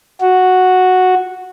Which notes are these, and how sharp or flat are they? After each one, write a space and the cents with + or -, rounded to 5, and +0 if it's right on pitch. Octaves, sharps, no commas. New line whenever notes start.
F#4 -5